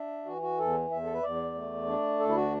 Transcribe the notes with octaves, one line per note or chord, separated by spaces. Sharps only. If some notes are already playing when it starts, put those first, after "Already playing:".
Already playing: D4 E5
E3 F#4
F#4
E2 A4
E2 E5
A4
B4
E2 D5
A3
D4
D2 A4
E4
F#4